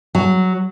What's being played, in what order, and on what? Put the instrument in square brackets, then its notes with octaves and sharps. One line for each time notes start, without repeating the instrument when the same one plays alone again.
[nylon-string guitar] F#3